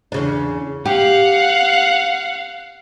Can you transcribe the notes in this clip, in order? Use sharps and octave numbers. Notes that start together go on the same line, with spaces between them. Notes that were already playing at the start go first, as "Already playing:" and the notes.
E2 C#3 D4
G4 F5 F#5